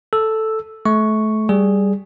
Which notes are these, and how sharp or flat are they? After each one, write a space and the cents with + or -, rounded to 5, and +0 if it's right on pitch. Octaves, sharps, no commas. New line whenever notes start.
A4 +0 E6 +0
A3 -30 C#6 +0
G3 +0 G#4 +0